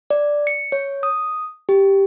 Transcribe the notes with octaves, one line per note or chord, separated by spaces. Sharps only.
D5
C#7
C#5
D#6
G4